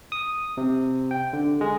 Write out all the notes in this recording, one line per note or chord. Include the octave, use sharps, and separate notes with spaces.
D#6
C3
G5
D3
G#3